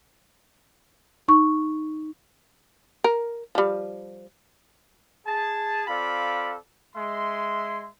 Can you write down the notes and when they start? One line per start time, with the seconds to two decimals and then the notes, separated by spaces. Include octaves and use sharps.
1.28 D#4 C#6
3.04 A#4
3.55 F3 G3
5.26 G#4 A5
5.87 C4 F4 A4 D5 F5 B5
6.95 G#3 E5 C6